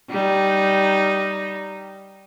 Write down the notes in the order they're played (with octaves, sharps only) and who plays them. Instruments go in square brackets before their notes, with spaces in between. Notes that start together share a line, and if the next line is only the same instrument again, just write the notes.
[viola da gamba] G3 D#4